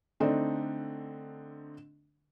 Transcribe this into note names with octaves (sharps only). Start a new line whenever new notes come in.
D3 A3 C4 D4 D#4